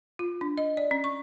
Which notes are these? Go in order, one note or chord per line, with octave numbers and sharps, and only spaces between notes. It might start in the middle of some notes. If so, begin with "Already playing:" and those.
F4
D4
D#5
D5
C#4
C#6